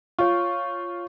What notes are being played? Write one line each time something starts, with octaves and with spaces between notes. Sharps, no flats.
F4 C#5 C#6